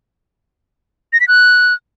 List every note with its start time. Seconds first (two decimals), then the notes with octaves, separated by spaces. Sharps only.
1.13 A#6
1.20 B6
1.28 F#6